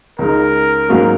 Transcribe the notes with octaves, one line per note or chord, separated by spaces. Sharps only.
C#2 C#3 G#3 D#4 A#4
G#2 F#3 A#3 C#4